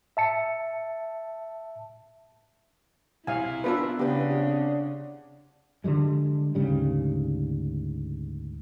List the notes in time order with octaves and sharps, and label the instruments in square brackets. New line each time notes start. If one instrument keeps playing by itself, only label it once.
[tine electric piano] E5 A5 C#7
[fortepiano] C2 [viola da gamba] E4 [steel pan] F5 G#5
[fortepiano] B3 D4 E6 [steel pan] F4 A#4 B4
[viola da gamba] C#3 [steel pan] B3 [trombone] D4 [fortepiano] G4 B4
[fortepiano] C3 F#5
[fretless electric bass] D3 E3 G3 G#3
D2 G#2 C#3 G3